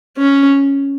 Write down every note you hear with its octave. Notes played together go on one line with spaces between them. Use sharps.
C#4